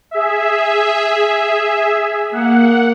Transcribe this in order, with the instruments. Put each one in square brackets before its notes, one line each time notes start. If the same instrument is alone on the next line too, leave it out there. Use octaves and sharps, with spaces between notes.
[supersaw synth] G#4 E5
[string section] A#3 [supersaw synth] F#5